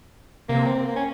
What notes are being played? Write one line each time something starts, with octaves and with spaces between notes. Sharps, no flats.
C3 A#3
C4
A#3
C#4